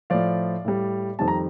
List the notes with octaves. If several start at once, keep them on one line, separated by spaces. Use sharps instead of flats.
A2 F3 D5 F5
A2 G3
F2 D#3 G3 A5
A#5